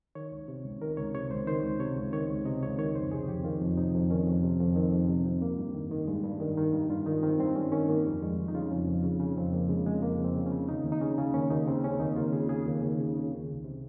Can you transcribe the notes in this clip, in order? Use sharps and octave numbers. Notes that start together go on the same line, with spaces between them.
D#3 C#5
C#2
C3
C#2
D#3 A#4
C#2 C#5
C3 C#5
C#2 C5
D#3 C5
C#2
C3 C#5
C#2
D#3 C#5
C#2
C3 D#5
C#2 C#5
D#3 C#5
F2 C5
C3 G#4
F2 G4
D#3 F4
F2
C3 D#4
F2
D#3 C#4
F2
C3
F2
D#3 C4
F2
C3
F2
G2 A#3
G2
D#3
D#3
G2 G#3
G2
D#3
D#3
G2 G3
G2 F4
D#3 D#4
D#3 C4
G2 C4
G2 C#4
D#3 C#4
D#3 A#3
F2 G3
F2 G#3
C#3
D#4
C#3 F4
F2 C#4
F2
C#3
C#3
F2 C4
F2 A#3
C#3 G#3
C#3 G#3
F2 A#3
F2
C4
C#3
C#4
C#3
D#2 D#4
D#2
D#4
C#3 C#4
C#3
D#2 C#4
D#2 D#4
C#3 C4
C#3 C#4
D#2 D#4
D#2 F4
C#3 G#4
C#3 G#4
D#2
D#2
C#3
C#3
D#3
C2
C3